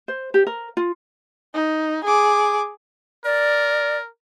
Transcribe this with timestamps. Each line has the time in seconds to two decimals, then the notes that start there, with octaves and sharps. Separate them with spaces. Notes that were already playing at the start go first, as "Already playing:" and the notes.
0.08 C5
0.34 G4
0.47 A#4
0.77 F4
1.54 D#4
2.04 G#4 D6
3.25 A#4 D5